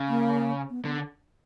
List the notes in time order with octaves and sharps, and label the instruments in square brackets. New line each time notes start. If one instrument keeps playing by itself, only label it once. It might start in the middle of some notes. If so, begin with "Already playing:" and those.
Already playing: [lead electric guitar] C#3
[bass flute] A#3
B3
[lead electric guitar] D3 [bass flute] B3